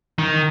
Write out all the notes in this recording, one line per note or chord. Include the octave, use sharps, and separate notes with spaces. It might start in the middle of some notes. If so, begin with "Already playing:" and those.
D#3